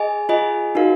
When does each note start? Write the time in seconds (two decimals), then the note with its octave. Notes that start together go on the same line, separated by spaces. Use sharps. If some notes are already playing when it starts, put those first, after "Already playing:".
Already playing: G#4 D#5 G#5
0.29 F4 G#4 D#5 G#5
0.75 D#4 F#4 A#4 F5